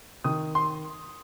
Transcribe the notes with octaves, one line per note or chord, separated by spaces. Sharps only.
D#3 D#6
C6